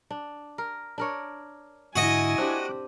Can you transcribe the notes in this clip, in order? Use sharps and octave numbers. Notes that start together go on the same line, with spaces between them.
D4
A#4
D4 A#4 C#5
G#2 D3 E4 F#4 D#5 G#5
C4 D4 G4 D6 F#6